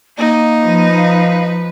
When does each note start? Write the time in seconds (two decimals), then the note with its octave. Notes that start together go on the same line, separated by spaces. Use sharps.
0.18 A#3 D#4
0.63 F3 B4
0.96 F5